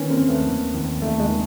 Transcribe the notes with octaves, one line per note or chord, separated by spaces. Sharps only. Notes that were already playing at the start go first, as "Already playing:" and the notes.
Already playing: D#3 B3 C#4
A#3 C4
D#2
A3 B3
D#2
D#2
D#2 A3
G#3
D#3